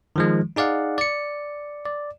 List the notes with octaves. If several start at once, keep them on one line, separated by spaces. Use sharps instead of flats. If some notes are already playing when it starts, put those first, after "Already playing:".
D#3 F3 G#3
D#4 G#4 D5 F5 F#5
D5 C#7
D5